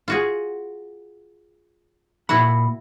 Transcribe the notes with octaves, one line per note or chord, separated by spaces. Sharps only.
F4 F#4 G#4
A#2 E4 F#4 F#5 B5